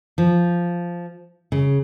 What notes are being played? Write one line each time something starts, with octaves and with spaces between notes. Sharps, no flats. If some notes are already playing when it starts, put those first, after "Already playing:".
F3
C#3